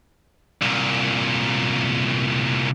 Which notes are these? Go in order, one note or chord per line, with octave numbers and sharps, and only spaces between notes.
C2 A#2